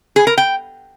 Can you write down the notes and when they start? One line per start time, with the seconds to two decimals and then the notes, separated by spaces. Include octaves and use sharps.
0.16 G#4
0.27 A#4
0.38 G5